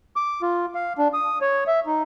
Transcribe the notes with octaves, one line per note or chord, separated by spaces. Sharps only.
D6
F4
F5
D4
D#6
C#5
E5
D#4